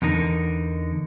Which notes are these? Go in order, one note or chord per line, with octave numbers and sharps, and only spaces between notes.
E2 D3 D#4 A#4